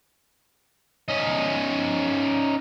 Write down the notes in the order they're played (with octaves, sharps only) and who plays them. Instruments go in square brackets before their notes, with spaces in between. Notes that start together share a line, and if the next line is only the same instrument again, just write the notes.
[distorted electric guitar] C#4 D#4